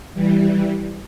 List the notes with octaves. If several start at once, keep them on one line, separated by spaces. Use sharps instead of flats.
E3 G3